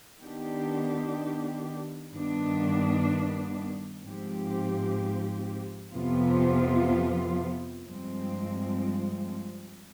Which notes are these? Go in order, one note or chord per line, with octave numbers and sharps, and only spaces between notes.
D#3 B3 D4 G4
G2 D#3 B3 D4
G#2 F3 C4 G4
F2 C3 F3 B3 F4
G2 F3 G#3 C4